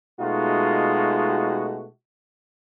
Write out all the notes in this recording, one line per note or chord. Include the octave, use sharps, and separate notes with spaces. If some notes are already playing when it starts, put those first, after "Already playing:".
B2 G#3 A3 D#4 F4 F#4